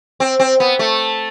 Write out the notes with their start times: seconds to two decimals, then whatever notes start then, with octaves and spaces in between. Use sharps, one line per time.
0.20 C4
0.39 C4
0.60 B3
0.79 A3